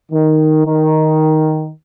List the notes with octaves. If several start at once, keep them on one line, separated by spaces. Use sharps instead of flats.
D#3
D#3